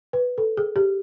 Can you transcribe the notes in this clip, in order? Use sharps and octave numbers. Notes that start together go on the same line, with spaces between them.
B4
A4
G#4
G4